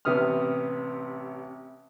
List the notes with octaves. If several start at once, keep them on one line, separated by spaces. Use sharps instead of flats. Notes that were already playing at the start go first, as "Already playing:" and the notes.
A1 C3 B3 D#6 F6